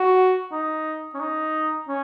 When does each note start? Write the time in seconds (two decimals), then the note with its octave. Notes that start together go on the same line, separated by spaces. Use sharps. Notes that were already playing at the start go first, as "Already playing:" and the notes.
Already playing: F#4
0.52 D#4
1.14 C#4
1.20 D#4
1.88 C#4